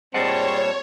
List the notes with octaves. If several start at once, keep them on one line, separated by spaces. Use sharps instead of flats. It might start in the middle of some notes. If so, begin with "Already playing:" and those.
A#2 G3 C4 G#4 C#5 D#5 F#5 A5